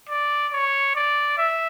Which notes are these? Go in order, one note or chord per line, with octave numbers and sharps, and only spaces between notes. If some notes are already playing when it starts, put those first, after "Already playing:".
D5
C#5
D5
E5